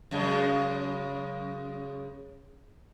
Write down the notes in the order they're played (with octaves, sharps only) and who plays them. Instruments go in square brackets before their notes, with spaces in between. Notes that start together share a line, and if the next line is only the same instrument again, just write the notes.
[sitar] F#2 C#3 G#3